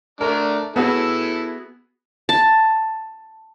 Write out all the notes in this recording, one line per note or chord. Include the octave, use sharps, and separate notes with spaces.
A3 D4 A#4
B3 E4 F#4 G#4 A4
A5